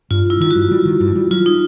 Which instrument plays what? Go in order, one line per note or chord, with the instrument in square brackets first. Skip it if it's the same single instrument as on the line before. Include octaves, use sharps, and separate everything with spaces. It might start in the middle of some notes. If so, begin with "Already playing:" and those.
[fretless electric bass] G2 [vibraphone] F4
[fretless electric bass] G2 [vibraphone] E4
[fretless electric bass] D#3 [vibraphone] F4
[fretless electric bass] G2 [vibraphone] F#4
[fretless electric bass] G3
D#3
G2
G3
[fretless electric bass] F#3 [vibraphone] F4
[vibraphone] D#4